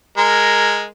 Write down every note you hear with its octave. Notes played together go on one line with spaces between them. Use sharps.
G#3 A#4